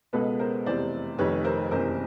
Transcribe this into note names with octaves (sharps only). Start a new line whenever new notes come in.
C#2 B2 G#3 B3 A4 B4
A#4 C5
F1 E2 C3 C5 D5
F1 F2 C3 D#3 B4 C#5
A#4 C5
F#1 E2 C3 A#4 C5